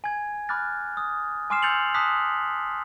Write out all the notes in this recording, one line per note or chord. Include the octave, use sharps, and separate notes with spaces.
G#5 G#6
B5 D6 F6 F#6 A6
D#6
G#5 C6 D6 F6 C7 E7
E6 G6 A6 C#7 F7 F#7
A5 D6 D#6 F#6 B6